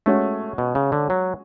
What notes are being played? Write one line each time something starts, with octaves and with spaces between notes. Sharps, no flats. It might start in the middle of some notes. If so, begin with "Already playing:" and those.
G#3 A3 C#4 F#4
B2
C#3
D3
F#3